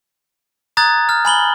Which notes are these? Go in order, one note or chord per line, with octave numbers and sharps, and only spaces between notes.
A#5 D#6 F#6 G#6 A6
F6
G#5 B5 F#7 G7